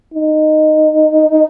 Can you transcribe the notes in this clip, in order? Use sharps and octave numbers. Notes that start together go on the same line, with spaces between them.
D#4